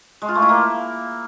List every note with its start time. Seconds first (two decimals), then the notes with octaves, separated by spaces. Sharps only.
0.22 G#3
0.29 F4
0.35 A3
0.42 E4
0.49 A#3